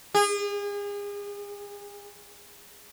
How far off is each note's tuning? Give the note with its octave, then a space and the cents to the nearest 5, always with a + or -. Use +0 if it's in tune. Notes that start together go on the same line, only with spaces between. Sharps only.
G#4 -35